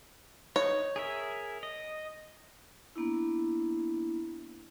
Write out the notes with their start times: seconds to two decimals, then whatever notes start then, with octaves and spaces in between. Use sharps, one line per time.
0.56 D#4 C#5
0.96 G#4 A#4 E5
1.63 D#5
2.96 A#3 B3 D4 E4